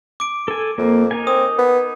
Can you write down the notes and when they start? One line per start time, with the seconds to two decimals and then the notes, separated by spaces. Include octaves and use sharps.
0.20 D6 D7
0.48 A4 G#5
0.78 F2 A#3
1.11 D#4 A#4 G#5
1.27 C4 D#6
1.58 B3